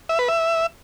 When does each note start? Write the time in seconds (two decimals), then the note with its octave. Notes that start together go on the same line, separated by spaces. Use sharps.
0.09 E5
0.19 B4
0.28 E5